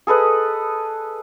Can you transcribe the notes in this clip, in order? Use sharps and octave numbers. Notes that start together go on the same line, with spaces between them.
G#4 A4 B4 D#5